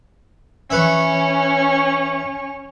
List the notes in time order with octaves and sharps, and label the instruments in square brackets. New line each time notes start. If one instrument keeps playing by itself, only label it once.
[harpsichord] E3 B4 E5 [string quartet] C#4 C#6